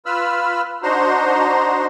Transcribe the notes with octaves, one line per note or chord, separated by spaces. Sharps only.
F4 B4 B5 E6 F6
D4 D#4 F#4 C5 A#5 C6